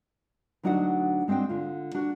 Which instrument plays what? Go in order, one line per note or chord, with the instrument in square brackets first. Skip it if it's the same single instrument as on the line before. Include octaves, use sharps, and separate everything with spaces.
[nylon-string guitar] D2 F#3 D4 D#4 F#4 F#5
G#3 C4 D4 F#4 G5
D3 F4
D4 F#4